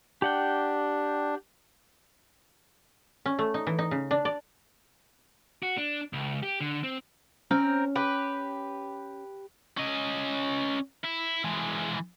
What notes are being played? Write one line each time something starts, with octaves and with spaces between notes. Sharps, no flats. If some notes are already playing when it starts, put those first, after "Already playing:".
D4 G4 F#5 G5
C#4
A3
D#4
E3
D#4
C#3
D4
D5
F#4
D4
C#2
G4
D3
C4
C4 C#4 A#4
G4 B4
C#4 D#5
E4
E3 G#3